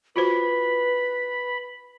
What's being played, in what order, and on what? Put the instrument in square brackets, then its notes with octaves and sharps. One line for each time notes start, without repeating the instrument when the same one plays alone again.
[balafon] F4 F#4 C5 [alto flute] B4 [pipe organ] B5